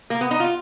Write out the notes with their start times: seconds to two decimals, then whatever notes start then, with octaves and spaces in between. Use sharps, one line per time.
0.10 A#3
0.21 B3
0.31 D#4
0.40 F4